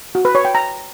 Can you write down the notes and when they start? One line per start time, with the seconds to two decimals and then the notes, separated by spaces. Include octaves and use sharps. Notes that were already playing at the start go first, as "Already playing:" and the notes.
0.15 F#4
0.25 B4
0.35 C#5
0.45 G5
0.55 A#5